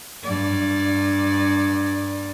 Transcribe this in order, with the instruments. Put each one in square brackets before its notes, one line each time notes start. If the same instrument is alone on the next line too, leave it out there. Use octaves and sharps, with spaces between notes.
[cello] G2 D5